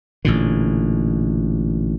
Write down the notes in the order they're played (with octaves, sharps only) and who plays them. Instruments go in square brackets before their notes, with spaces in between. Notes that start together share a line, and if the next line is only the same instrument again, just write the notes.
[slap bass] A1 A#2 D3